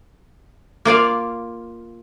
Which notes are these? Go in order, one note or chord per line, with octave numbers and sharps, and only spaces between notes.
A#3 F4 D5 F5